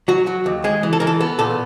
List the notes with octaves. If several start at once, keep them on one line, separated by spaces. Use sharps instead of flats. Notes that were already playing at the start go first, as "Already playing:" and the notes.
F#3 F#4
F#3
D#2
G#3 G#4
E3
A4
E3 A#4
A4
B3 A4
A#2 A4